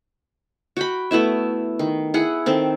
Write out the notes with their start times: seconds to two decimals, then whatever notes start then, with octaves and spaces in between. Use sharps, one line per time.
0.77 F#4 G5 B5
1.11 A3 B3 E4 E5
1.79 D#3
2.14 E4 G#4 F#5
2.46 D#3 C4 A4